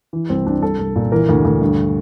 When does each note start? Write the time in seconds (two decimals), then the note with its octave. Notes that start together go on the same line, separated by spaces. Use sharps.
0.13 E3
0.29 C2 C4
0.46 C2 D4
0.62 C2 A4
0.79 C2
0.96 A#2
1.12 E3 A#4
1.29 D2
1.45 D2
1.61 G2